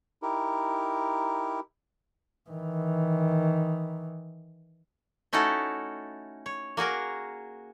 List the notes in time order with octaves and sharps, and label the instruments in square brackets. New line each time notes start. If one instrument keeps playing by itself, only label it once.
[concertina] D#4 E4 G4 A#4
[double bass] D#3 E3
[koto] A3 C#4 D#4 E4 F#4 A4
C#5
A#3 F#4 G#4 A#4